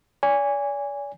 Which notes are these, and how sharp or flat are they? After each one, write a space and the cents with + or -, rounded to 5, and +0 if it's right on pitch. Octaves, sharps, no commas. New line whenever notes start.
D5 -45 G#5 -15